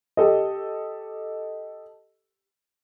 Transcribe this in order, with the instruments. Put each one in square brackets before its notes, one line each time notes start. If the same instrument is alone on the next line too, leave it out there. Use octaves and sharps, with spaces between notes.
[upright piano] G4 A4 D#5